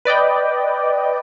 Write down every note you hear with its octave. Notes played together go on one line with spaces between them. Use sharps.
B4 D5 D#5 G5